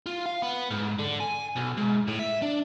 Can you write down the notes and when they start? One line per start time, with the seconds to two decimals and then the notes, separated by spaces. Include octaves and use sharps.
0.06 F4
0.26 F5
0.42 B3
0.71 G#2
0.99 D3
1.21 G#5
1.57 B1
1.78 G#2
2.08 A2
2.19 E5
2.42 D4